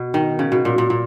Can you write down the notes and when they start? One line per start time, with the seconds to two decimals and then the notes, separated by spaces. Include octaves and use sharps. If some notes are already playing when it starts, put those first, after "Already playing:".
Already playing: B2
0.14 D#3
0.39 C#3
0.52 B2
0.65 A#2
0.78 A#2
0.90 A#2